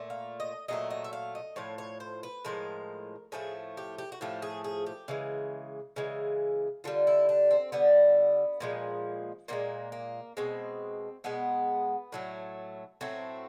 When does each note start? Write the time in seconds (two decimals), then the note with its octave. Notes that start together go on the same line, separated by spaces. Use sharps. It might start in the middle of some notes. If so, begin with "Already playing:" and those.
Already playing: A#2 A3
0.10 F5
0.40 D#5
0.68 A#2 F#3 A3 D#5
0.90 D#5
1.04 E5
1.13 F5
1.35 D#5
1.56 A2 F3 C#5
1.78 C#5
2.00 C5
2.23 B4
2.45 A2 F3 G#3 A#4
3.32 A2 F3 A3 G#4
3.77 G4
3.98 G4
4.12 F#4
4.21 A2 F3 A3 G4
4.42 G#4
4.64 G#4
4.86 G4
5.08 C#3 E3 G#3
5.96 C#3 E3 G#3
6.84 D3 G3 F4
7.07 E4
7.29 D4
7.51 C4
7.72 D3 G3 B3
8.60 A#2 F3 G#3
9.48 A#2 F3 A#3
9.53 G#3
9.92 A#3
10.37 B2 G#3 C4
11.24 B2 G#3 B3
12.12 A2 F#3 A3
13.01 A2 F#3 A3 C4